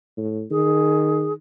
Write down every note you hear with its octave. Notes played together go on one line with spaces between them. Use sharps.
A2
D#3 G#4